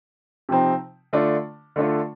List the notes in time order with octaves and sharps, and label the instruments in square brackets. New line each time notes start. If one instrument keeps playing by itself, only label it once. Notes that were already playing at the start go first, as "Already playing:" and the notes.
[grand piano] C3 F3 C4 D#4
D3 A3 D4 F4
D3 A3 D4 F4